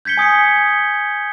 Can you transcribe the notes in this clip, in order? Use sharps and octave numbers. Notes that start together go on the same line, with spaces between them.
G6 G#6 B6 C#7 G7
G#5 D#6 G#6 C#7